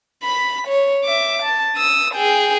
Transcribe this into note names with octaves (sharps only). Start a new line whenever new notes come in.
B5 B6
C#5
E5 D6
A5
D#6 E6
G#4 G5